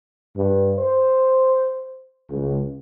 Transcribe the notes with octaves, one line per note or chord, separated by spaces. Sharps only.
G2
C5
C#2